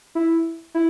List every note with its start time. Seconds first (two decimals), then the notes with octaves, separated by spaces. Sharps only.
0.15 E4
0.74 E4